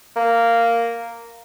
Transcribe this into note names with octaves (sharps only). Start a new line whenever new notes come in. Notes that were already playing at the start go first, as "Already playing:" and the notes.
A#3